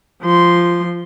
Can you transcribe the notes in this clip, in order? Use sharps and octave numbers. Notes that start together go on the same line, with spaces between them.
F3 C6